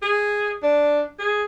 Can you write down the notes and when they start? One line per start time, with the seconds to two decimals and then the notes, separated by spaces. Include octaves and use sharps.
0.02 G#4
0.63 D4
1.19 G#4